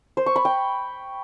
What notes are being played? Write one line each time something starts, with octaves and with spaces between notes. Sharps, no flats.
C5
C#6
B5
G5